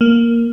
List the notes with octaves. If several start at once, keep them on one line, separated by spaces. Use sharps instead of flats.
A#3